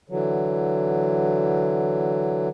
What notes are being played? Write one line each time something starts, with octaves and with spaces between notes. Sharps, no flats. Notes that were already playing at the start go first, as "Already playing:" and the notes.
D3 E3 F#3